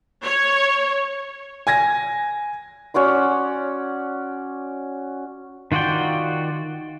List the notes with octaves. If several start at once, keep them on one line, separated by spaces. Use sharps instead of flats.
C#5
G#5 G#6 A#6
C#4 F#4 D5 C6
D#3 F4 F#4 D5 G5